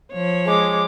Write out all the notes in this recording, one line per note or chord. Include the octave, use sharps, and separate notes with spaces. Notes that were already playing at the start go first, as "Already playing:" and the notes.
F3 C#5
G#3 D6